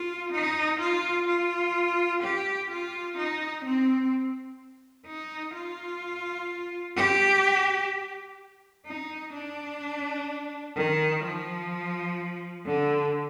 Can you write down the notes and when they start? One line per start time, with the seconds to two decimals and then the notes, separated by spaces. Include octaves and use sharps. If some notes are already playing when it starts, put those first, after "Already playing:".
Already playing: F4
0.32 D#4
0.80 F4
1.27 F4
2.22 G4
2.70 F4
3.17 D#4
3.65 C4
5.07 D#4
5.55 F4
6.97 G4
8.86 D#4
9.34 D4
10.76 D#3
11.23 F3
12.66 D3